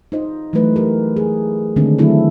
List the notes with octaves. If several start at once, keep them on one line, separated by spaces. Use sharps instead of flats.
D#4 F4 C5 D#5
E3 F#3 G#3 A3 B4
G4 A#4
G#4
D3 D#3 G#3 A3 C4 D4
D#3 F#3 A3 C4 E4 A4